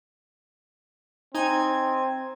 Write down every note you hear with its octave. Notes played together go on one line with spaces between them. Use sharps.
C4 D#4 G#5 G#6